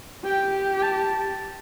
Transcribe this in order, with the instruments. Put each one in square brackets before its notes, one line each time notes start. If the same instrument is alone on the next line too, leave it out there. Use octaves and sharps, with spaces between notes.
[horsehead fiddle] G4 [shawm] G5
[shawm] G5
A5